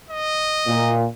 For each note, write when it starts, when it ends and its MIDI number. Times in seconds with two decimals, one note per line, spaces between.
0.11 0.98 75
0.67 1.05 46